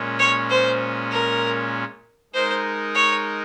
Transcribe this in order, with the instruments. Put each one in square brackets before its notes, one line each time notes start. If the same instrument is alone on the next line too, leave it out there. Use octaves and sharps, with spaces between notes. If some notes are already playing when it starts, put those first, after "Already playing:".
Already playing: [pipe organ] A#2 G#3 C#4
[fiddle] C#5
C5
A#4
[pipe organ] G#3 D#4 A#4 [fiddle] C5
[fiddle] C#5